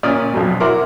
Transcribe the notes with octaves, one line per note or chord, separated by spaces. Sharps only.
A#2 C#4 D5 D#6 F6
B1 F2 B2
E4 F#4 A#4 C6 D6